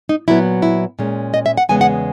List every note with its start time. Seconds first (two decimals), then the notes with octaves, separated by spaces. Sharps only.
0.09 D#4
0.28 A#2 F#3 B3 E4
0.62 E4
0.99 A#2 G#3 C#4
1.34 D#5
1.46 E5
1.57 F#5
1.69 E2 C#3 G#3 B3 G#5
1.81 F#5